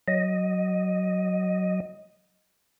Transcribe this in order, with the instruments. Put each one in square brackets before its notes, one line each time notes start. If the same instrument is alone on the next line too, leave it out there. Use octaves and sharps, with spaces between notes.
[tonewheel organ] F#3 D#5